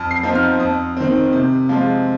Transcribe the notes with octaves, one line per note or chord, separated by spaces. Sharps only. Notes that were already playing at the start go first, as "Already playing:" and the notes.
Already playing: F2 F6
C7
F3 C4 D#4
F6
F2 D#6
D#3 C4
C3
F3 G#3 F4